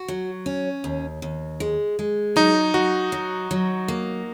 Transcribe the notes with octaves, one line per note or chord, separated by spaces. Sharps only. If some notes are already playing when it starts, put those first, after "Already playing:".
Already playing: F#4
F#3
C#4
D#2
D#2
G#3
G#3
F#3 D#4
F#3 F#4
F#3
F#3
A#3